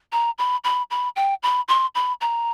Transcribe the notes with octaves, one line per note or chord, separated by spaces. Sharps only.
A#5
B5
B5
B5
G5
B5
C6
B5
A#5